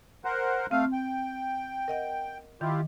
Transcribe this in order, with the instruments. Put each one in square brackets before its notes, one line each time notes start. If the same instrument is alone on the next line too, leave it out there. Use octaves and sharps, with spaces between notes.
[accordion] A#4 C5 F#5
[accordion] A3 F5 [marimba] C4
[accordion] G5
[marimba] A#4 D#5 F#5
[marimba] D#3 [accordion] E4 F4 G4